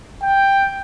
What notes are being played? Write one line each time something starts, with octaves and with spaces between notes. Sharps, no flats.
G5